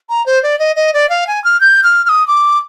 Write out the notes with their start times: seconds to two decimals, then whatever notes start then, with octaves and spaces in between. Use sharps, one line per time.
0.09 A#5
0.26 C5
0.43 D5
0.59 D#5
0.76 D#5
0.94 D5
1.10 F5
1.27 G#5
1.44 F6
1.61 G6
1.84 F6
2.06 F6
2.09 D#6
2.28 D6